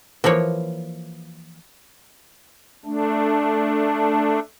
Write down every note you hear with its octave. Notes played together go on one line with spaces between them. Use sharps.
E3 F3 A#3 C#5
A3 D4